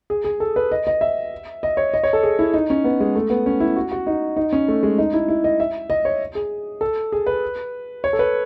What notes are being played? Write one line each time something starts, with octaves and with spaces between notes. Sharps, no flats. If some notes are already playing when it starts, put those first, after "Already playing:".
G#4
G#4
A4
B4
D#5
D#5
E5
D#5
C#5
D#5
C#5
A4
G#4
E4
D#4
C#4
B3
G#3
A3
B3
C#4
E4
F#4
F#4
D#4
D#4
C#4
A3
G#3
D#4
E4
E4
D#5
E5
D#5
C#5
G#4
A4
G#4
B4
C#5
A4
B4